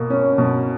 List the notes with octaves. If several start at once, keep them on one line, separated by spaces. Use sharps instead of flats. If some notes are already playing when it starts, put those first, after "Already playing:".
Already playing: B2 A#3
C#4
B2